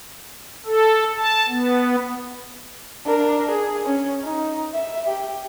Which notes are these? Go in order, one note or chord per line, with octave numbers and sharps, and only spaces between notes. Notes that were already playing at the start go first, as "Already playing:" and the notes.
A4
A5
B3
D4 A#4
G#4
C#4
D#4
E5
G4